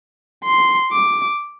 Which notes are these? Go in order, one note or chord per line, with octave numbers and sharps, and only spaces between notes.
C6
D6